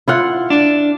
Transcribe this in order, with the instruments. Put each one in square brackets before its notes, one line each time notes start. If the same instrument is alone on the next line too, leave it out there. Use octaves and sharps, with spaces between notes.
[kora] E4 F4 F#5
[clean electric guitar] D4